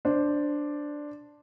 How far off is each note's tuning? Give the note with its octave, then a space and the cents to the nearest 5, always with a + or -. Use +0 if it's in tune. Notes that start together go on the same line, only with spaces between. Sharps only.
D4 +0 C5 +0